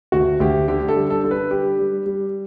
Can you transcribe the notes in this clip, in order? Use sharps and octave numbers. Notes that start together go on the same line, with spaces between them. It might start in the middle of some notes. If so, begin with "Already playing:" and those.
D2 F#4
D2 G4
D3 G4
A4
G3
A4
D3 A4
B4
G3 G4
G3
G3